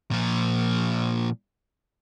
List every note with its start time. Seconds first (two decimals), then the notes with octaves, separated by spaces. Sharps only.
0.11 A#2 F3